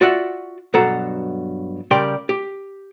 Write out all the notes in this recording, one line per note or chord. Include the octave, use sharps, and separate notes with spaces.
F4 F#4 D5 E5 F#5
G2 B2 F#3 A4 F#5 A#5
C#3 G3 G4 A#4 D5 C6
G4